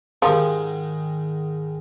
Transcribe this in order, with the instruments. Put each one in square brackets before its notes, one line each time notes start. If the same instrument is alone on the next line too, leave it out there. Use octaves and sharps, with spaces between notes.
[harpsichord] G#2 D#3 [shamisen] F3 [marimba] G4 A#4 F5